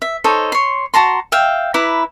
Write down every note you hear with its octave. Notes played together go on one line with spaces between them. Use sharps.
E5
D#4 A4 C5 C#5
C#5 C6
F#4 A5 A#5 C6
E5 F5 G5
E4 B4 A#5 D6